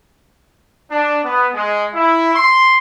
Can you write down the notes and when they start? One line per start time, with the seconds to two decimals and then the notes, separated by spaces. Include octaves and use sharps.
0.90 D4
1.24 B3
1.54 G#3
1.93 E4
2.34 C6